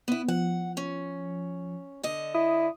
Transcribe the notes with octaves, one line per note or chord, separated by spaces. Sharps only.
B3 E4
F3 F#5
C#4
D3 D#5
E4 D#6